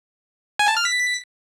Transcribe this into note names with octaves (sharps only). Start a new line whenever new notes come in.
G#5
A5
F6
B6